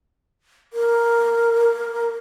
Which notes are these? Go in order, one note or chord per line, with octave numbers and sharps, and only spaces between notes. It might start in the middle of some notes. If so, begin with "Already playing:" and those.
A#4